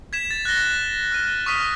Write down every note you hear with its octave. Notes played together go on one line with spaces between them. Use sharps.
G#6 B6 E7
A6
F#6 A6 A#6 G7
F6 D#7
C#6 D#6 F6 B6